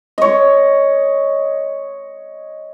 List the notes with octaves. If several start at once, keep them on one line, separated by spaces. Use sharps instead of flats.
C#5 D#5